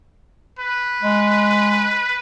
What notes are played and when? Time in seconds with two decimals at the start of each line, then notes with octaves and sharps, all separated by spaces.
0.59 B4
1.03 G#3